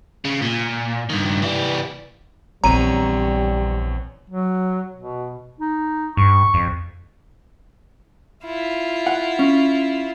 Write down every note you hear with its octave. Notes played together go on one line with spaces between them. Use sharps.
C#3
A#2
G2 D#3
E3 G3
A#1 E2 G3 C4 C#5 A#5 D#7
F#3
B2
D#4
G2 C#6
F2
E4 F4
F#5
C#4